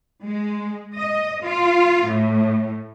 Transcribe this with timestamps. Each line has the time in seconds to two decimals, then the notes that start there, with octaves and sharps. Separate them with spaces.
0.23 G#3
0.97 D#5
1.43 F4
2.07 A2